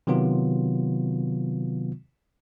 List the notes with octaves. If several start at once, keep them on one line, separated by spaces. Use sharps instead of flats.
C3 D#3 F#3 B3 F4